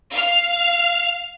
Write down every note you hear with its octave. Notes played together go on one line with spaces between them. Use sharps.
F5 F6